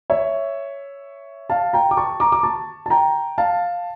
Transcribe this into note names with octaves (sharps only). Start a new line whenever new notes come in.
C#5 E5
F5 A5
G5 A#5
D6
A5 C#6
A#5 D6
D6
A5 C#6
A5
G5 A#5
F5 A5